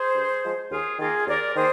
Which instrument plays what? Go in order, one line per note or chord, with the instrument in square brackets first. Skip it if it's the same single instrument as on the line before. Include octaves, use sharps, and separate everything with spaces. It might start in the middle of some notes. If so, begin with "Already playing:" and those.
Already playing: [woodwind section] G#4 C5
G2
F3 G#3
D#2 F4 G#4
D#3 A#3 F4 G#4
D#2 A#4 D5
D#3 A#3 G#4 C5